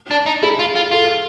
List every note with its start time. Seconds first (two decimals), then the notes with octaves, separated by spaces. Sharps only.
0.11 D4
0.26 D#4
0.43 E4 G#4
0.59 F4
0.76 F4
0.91 F4 A4